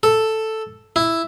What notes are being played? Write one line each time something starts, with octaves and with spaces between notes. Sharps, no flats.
A4
E4